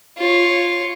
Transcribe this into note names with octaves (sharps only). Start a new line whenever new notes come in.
F4 C#5